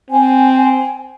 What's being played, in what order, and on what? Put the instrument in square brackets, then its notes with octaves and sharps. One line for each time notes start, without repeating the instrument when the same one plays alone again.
[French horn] C4 [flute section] G#5